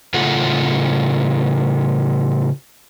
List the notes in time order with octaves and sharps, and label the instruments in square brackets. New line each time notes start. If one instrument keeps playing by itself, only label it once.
[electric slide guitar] A2 C#3 F4 A4 F#5